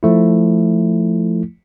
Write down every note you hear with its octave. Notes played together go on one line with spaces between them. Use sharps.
F3 A3 E4